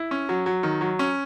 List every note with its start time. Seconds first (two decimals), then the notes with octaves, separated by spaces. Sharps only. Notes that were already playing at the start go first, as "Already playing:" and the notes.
Already playing: E4
0.11 C#4
0.29 F#3
0.46 F#3
0.63 D#3
0.81 F#3
0.99 C#4